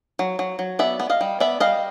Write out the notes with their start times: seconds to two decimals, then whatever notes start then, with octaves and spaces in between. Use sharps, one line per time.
0.19 F#3
0.39 F#3
0.59 F#3
0.79 B3 D5 E5
1.00 B3
1.10 D#5 F5
1.21 G3
1.40 B3 D5 E5
1.60 G3 D#5 F5